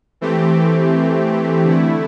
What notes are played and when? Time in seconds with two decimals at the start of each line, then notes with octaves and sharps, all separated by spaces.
0.21 E3 A3 C4 G4
1.65 D3 A3 E4